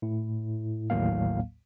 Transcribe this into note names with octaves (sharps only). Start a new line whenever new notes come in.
A2 E4
A1 D#2 A2 F#3 A#3 F5